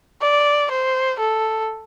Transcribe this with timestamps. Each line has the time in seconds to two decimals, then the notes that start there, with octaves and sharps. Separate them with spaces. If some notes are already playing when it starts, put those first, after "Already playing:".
0.22 D5
0.71 C5
1.19 A4